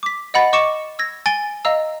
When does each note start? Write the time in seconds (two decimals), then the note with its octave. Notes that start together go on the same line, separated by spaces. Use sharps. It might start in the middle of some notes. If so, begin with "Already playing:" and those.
0.03 D6 B6
0.34 D#5 F#5 B5 A6
0.53 D#5 C#6 D6 C#7 E7
0.99 E6 G#6 A#6
1.26 G#5 A6 D7 G7
1.65 D#5 F5 A#5 E6